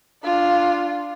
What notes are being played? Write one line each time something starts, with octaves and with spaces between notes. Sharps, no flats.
D4 F4